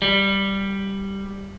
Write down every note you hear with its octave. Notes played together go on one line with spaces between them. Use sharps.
G3